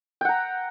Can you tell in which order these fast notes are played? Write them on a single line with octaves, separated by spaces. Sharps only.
G5 F#5 A#5